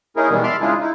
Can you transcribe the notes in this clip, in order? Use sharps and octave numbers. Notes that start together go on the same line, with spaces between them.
A#3 C#4 D#4 E4 G#4 A#4
B2 D#3 E3 G3 G#3 B3
E5 A5 B5 C6 D6 F6
C#3 G#3 D4 E4 F4 G#4
D#4 E4